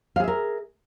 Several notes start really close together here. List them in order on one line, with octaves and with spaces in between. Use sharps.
F5 G#4 E5 A#4